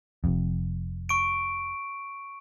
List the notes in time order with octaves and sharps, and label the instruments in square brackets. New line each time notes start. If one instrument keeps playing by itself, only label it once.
[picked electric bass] F1 F2
[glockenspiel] C#6 D7